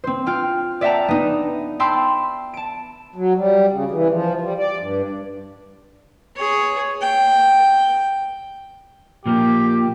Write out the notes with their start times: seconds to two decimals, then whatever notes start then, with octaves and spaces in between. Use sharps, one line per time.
0.04 C4 C5
0.26 F4 G5 F6
0.81 D5 E5 F#5 G5 A5 A#5
1.08 B3 D#4
1.80 G5 A5 B5 C6 E6
2.54 A5 D7
3.16 F#3
3.37 G3
3.71 C#3
3.91 E3
4.10 F3
4.41 G3
4.58 D5
4.80 G2
6.36 G#4 C#5
7.02 G5
9.26 A#2 F3 A#3 G4